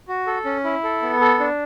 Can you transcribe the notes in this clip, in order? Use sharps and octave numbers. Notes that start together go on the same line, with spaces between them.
F#4
A4
C#4
E4
A4
B3
A4
D4